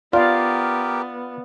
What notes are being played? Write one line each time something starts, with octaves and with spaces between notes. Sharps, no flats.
B3 F4 G4 A#4 D5 F5